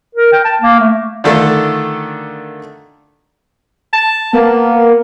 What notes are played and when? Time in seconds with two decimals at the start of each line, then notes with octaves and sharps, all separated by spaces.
0.15 A#4
0.33 G5
0.45 A5
0.62 A#3
0.80 A3
1.24 D3 D#3 A3 D4 F4 A4
3.93 A5
4.33 A#3 B3